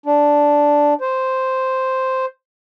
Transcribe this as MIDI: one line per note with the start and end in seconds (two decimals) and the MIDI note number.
0.06 0.94 62
1.01 2.26 72